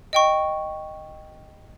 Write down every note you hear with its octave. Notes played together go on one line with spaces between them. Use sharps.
D#5 G5 C#6